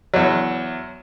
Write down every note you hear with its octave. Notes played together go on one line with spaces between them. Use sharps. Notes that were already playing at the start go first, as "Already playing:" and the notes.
E2 F#3